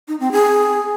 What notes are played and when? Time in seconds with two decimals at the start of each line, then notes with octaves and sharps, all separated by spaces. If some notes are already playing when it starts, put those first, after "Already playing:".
0.08 D#4
0.20 C4
0.32 G#4